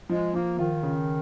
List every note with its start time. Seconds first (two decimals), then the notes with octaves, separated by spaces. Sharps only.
0.09 F3 G#3
0.34 F3 A#3
0.58 D#3 F4
0.83 C#3